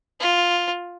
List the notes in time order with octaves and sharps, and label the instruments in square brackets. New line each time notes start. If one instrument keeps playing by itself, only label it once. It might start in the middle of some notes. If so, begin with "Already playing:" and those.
[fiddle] F4